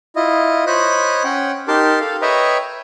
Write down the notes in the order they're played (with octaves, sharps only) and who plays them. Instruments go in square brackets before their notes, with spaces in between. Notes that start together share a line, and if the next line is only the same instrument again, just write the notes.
[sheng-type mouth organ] E4 F4 D#5
C5 C#5 D#5 B5 F#6
C#4 F#5 G5
D#4 G4 A#4 A5 C6 D6
A4 F5
B4 C#5 D#5 E5 G5 A#5